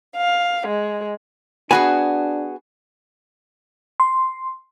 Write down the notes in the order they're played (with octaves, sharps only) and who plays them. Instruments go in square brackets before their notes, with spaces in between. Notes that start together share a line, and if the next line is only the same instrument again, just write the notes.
[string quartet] F5
G#3
[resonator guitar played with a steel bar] B3 F#4 G#4 [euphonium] D4 [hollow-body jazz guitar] G#5 B5
[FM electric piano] C6